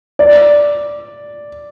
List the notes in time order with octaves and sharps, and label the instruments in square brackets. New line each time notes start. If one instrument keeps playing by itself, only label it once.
[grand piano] D5